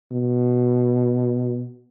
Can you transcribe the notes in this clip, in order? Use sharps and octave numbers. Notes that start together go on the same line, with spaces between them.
B2